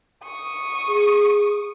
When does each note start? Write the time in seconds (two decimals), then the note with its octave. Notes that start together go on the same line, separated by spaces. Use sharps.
0.24 C#6 D#6
0.87 G#4